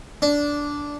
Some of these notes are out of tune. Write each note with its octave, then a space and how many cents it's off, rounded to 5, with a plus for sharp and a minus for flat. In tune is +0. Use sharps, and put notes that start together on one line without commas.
D4 -10